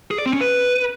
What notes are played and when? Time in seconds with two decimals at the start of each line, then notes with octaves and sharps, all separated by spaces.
0.11 G#4
0.18 D5
0.26 C4
0.33 C#4
0.41 B4